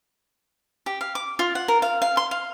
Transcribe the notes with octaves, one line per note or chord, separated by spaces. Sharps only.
G4
F5
D6
F4
F#5
A#4
F5
F5
C6
F5